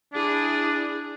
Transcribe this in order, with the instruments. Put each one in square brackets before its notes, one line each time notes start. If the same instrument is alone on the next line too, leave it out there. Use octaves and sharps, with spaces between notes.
[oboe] D4 [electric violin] E4 G#4